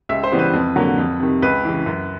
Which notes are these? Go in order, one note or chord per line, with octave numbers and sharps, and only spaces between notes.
C#2 E5
C5
C#3 E3 G3 B3
B4
F2
D3 F#3 A#3
F2
C3 D#3
C#2 B4
C#3 E3
F#2